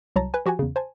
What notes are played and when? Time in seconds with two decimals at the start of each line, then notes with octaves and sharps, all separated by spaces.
0.16 C2 F#3 C#5 A5 A#5
0.34 B4 G#5
0.46 F3 F#4 G4 F#5 G#5
0.59 E2 C#3
0.76 C5 G#5 A5